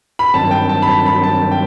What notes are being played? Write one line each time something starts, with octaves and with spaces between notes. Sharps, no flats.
B5
G2 D#3 F#3 C4 A5
G5
A5
B5
A5
B5
A5
G5